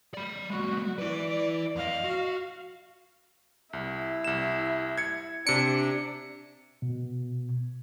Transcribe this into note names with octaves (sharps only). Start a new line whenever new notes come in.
D5 B5
F#3 G#3 F#4
E4 B4 D5
D5
F2 D#5 F5
F#4
C2 E4
C2 E7
G#6 C#7
C3 D4 C#7 D7
B2